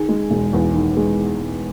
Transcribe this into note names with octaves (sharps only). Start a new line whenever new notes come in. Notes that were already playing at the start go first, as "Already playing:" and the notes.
Already playing: D#3 G#4
G#3
E1
E2
D#3
G#3